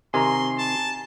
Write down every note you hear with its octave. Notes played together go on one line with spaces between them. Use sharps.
C3 D#3 G#5 A#5 C6
A5